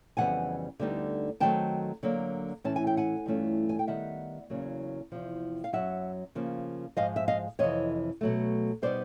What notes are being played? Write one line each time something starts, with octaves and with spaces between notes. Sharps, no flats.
F2 C#3 E3 G3 B3 F#5 G#5
D2 D3 G3 B3 D#4
D#3 F#3 A3 C4 G5 A5
D3 F#3 A#3
A2 E3 A3 C#4 A5
G#5
G5
F#5 G#5
G2 E3 A3 C#4 F4
G#5
G5
D#3 G3 B3 E5 F#5
E2 C#3 F#3 A#3
E2 C3 F3
F5
F#2 C#3 F#3 E5 F#5
C#3 F3 A#3
G#2 F3 G#3 D#5 F5
E5
D#5 F5
F2 C3 E3 C#5 D#5
B2 F#3 A3
B2 G3 B3 D#4 C5 D5